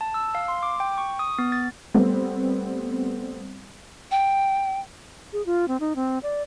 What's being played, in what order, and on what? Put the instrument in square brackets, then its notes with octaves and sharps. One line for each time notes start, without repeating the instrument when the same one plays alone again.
[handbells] A5
E6
F5
C6
D6
G5
C#6
D#6
B3
A6
[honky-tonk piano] G3 A3 B3 C4
[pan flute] G5
[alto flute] G#4
F4
C4
D#4
C4
D5